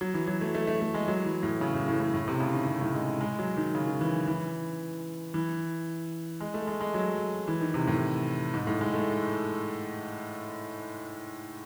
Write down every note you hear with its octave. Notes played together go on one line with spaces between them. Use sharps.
F#3
E3
F#3
A3
A3
A3
A3
G#3
F#3
E3
A2
C#3
A2
A2
A2
A2
C3
C#3
D#3
C3
A2
G#3
G#3
F#3
D#3
C#3
D#3
E3
E3
E3
G#3
A3
G#3
G#3
F#3
E3
D#3
C3
A2
G#2
A2
G#3
A3